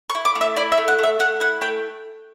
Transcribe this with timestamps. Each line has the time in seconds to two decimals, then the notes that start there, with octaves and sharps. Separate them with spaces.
0.10 C#6
0.15 E4
0.25 D6
0.35 A3
0.41 E5
0.56 E4 D5
0.72 E5
0.78 A3
0.88 F#5
0.99 A3 E5
1.19 A3 F#5
1.40 E4 F#5
1.61 A3 G5